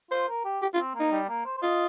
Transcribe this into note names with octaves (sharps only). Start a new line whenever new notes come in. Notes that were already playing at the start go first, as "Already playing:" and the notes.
F4 C5
A#4
G4
G4
F4
C4
A#3 D#4
G3
A#3
C5
C5
F4 D#5